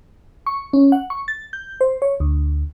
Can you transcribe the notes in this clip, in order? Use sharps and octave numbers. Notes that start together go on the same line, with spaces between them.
C#6
C#4
F#5
C#6
A6
G6
C5
C#5
D2